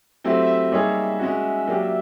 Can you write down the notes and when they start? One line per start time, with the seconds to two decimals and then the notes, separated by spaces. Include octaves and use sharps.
0.24 F#3 A3 C4 E4 G4 E5
0.72 G3 A#3 D#4 G#4 C#5
1.19 G#3 C#4 F#4
1.67 F#3 A#3 D4 G4